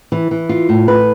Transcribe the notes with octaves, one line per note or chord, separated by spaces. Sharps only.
E3
E3
F4
A2
B4